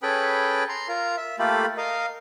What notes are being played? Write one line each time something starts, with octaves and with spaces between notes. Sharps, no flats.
C#4 G#4 A4 B4 G5 B5
A#5 C6
F4 A#4 A#5
E5
A3 A#3 F4 G4 A4 B5
A#4 D#5 F5